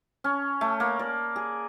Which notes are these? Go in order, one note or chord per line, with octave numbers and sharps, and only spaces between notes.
C#4
A3
A#3
D5
G#4